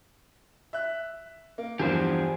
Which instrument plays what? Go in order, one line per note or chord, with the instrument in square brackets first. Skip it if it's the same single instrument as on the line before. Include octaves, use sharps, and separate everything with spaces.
[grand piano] E5 F#6
A#3
[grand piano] E2 G2 F3 [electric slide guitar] G4 G#4 C5